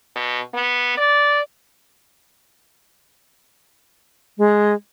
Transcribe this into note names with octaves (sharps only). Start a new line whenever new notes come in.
B2
B3
D5
G#3